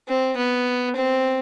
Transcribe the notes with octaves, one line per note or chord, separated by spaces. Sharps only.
C4
B3
C4